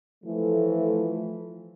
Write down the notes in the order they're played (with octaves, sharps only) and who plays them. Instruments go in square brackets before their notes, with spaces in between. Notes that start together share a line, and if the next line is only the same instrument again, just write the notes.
[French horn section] E3 F3 A3